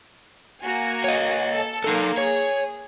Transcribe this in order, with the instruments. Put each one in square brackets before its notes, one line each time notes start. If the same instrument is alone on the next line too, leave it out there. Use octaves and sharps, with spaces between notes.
[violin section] A#3 F#4 G#5
[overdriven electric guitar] C#5 D#5
[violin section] A4
[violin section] A#3 [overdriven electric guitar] D#4 A4
[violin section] G#4 [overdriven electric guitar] C#5